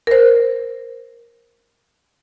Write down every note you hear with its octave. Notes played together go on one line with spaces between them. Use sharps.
A#4 C5